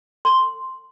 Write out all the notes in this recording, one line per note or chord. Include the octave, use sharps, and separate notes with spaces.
C6